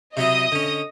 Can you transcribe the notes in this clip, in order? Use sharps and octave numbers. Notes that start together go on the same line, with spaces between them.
C3 F#3 E4 D#5 D#6
D3 C#4